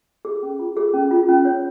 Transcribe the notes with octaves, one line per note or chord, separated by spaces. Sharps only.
G#4
C#4
F4
G#4
C#4
F4
C#4
C#5